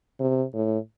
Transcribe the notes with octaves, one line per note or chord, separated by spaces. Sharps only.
C3
A2